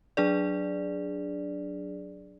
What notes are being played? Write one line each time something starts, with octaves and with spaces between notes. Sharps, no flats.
F#3 D4 G#4 D5